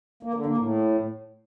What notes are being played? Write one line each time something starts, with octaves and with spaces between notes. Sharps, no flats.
A#3
D3
A#3
A2